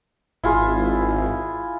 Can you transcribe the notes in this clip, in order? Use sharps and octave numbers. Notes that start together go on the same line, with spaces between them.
G#1 E4 F4 G#4